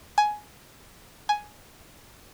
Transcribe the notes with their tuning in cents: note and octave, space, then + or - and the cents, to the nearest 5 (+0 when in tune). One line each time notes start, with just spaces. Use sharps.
G#5 +15
G#5 +10